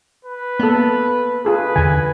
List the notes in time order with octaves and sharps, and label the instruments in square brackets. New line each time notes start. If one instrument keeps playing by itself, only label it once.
[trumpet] B4
[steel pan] A#3 A4 [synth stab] B3
[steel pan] F4 G#4 A4 [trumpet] B4
[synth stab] E2 D3 [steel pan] G#5